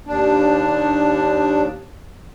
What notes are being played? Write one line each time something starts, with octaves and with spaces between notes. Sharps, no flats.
D#2 D4